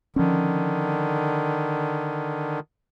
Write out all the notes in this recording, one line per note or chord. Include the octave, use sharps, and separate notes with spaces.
D3 D#3 F3 C#4